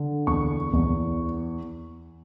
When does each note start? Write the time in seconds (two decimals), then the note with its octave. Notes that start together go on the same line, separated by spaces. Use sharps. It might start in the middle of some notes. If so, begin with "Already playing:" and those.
Already playing: D3
0.27 E2 C#6
0.73 E2